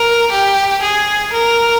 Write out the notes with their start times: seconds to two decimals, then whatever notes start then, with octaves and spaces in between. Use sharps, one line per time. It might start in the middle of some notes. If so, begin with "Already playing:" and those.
Already playing: A#4
0.31 G4
0.82 G#4
1.33 A#4